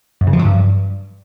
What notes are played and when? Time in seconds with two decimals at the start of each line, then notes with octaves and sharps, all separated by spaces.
0.21 F#2
0.27 C#3
0.33 F3
0.39 F#3
0.45 G2